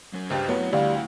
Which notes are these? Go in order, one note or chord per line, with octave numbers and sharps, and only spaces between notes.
F#3 C#4
C#2 G2 G3 C5
F#3 A3 B3 E4 F#4
D2 G3 D5 F5 G5